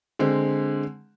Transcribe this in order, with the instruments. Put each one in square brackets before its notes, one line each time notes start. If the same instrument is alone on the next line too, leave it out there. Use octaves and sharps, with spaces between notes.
[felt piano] D3 G#3 C4